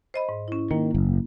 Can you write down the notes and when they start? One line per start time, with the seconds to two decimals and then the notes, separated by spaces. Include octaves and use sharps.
0.14 C5 D#5 B5
0.29 G#2
0.48 C#4 E4
0.71 D#3 A#3
0.95 F#1